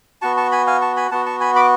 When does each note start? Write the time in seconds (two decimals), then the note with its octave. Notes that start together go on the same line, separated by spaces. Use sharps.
0.22 B3 F#4 A5 C#6
0.37 A5 C#6
0.52 G#5 B5
0.67 F5 G#5
0.81 A5 C#6
0.96 G#5 B5
1.11 B3 F#4 F#5 A5
1.26 A5 C#6
1.40 G#5 B5
1.56 B5 D6